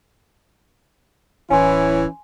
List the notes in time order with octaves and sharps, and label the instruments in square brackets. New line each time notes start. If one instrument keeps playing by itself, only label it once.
[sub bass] D1 [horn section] E3 C#4 E4 [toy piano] G#5 C6